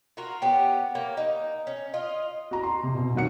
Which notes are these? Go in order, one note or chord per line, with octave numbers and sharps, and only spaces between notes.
F4 F#4 A#4
B3 C#4 G4
A#3 C#5
D#4
C#4
F4 D#5
F#4 A#5
C6
C3
B2
D#3 F#3 F#5 C#7